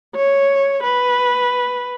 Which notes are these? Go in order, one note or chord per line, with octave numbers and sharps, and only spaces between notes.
C#5
B4